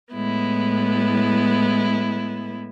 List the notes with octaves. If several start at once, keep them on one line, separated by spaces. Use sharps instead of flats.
A2 G#3 B3 E4